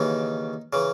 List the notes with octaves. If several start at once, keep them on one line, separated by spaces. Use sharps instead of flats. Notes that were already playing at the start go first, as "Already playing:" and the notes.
Already playing: D#2 C#3 E3 D#4
C#3 E3